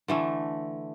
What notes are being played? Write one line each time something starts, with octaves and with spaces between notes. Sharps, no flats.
D3 E3 A3